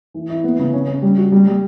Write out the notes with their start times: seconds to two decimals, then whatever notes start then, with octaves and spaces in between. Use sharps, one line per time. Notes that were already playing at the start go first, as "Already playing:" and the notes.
0.14 E3
0.30 E4
0.44 B3
0.59 C#3
0.74 C#4
0.87 C#4
1.02 G3
1.18 F#4
1.32 G3
1.47 G3